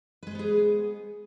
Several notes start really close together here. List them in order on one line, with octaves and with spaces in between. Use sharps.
B4 G#3 C5 B3 G#4